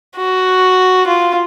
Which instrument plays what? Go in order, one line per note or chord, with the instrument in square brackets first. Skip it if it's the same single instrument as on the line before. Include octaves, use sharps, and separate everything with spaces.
[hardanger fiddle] F#4
F4